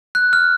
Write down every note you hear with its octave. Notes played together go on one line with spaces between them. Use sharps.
F#6
F6